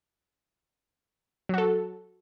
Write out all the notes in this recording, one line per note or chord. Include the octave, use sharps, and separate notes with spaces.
F#3 F#4 A4